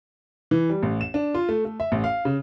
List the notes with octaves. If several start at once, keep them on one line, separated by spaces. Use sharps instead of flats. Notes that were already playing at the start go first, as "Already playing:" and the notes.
E3
G3
A1
E7
D4
F4
A3
A3
E5
A1
F5
C#3